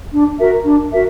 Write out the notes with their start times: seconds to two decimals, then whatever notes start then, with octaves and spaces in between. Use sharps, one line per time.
0.12 D4
0.39 F#4 A#4 E5
0.65 D4
0.91 F#4 A#4 E5